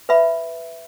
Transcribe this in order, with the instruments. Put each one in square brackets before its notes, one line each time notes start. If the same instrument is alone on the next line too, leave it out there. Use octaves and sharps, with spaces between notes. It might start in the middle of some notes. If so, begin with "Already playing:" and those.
[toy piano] B4 E5 B5